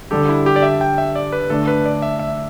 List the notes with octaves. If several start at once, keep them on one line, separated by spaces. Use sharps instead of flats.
D3 G3 D4 G4 A4
E4
G4
D5
E5
G5
E5
D5
B4
D3 A3 D4 A4
B4
D5
E5
E5